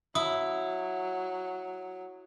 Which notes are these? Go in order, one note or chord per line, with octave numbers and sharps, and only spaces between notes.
F#3 E4 D#6